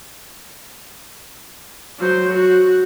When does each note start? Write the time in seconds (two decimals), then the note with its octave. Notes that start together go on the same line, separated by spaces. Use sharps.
1.99 F#3 C5
2.34 F#4